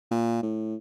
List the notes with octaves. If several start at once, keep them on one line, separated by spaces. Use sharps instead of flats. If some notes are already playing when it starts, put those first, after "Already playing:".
A#2
A2